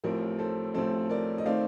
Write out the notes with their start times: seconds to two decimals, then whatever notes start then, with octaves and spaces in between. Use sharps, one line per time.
0.04 A1 A2 F3 C4 A#4
0.39 A4 C5
0.74 A1 A2 F3 C4 A4 C5
1.10 A#4 D5
1.38 D#5
1.46 D#3 A3 C4 D5 F5